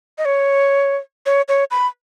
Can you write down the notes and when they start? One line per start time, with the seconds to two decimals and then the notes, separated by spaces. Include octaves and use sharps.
0.18 D#5
0.25 C#5
1.26 C#5
1.48 C#5
1.71 B5